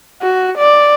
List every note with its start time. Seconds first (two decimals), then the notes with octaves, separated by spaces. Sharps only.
0.22 F#4
0.58 D5